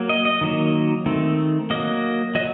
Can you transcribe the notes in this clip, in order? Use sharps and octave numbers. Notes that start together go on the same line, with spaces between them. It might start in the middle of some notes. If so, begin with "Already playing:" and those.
Already playing: F#3 A#3
D#5
D#5
D#3 F#3 A#3
D#3 A3 C4
F#3 A#3 D#5
F#3 D#5